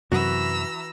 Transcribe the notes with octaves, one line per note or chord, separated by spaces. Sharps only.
F#2 C3 E3 F#4 A#5 E6